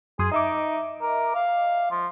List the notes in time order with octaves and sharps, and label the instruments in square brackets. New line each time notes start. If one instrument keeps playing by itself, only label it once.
[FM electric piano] F#2 C6 D#6 [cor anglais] G#4
[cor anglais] D#4 [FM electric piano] D#5 E5 D6
[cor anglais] A#4
F5
F3